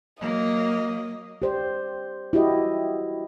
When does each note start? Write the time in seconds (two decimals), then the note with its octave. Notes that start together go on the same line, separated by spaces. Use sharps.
0.20 F#3 A#3 D#5
1.42 G4 C5 D5
2.33 E4 F#4 G4 D#5